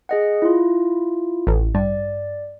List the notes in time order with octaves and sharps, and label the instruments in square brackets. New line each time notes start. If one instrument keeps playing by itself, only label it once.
[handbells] G#4 D#5 F#5
E4 F4
[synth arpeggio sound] A1
[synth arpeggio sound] G2 [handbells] D5